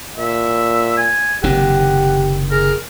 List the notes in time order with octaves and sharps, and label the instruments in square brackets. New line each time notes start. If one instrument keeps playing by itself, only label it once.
[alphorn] A#2 [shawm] E5
[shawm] G#5
[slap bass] F#1 C3 D#3 [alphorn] G4 [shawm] F#5
[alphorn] G#4 [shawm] A#4